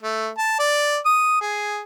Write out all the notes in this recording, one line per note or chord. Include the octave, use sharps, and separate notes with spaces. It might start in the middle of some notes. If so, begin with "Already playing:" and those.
A3
A5
D5
D#6
G#4